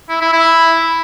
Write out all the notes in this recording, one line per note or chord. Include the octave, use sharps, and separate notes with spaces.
E4
E4
E4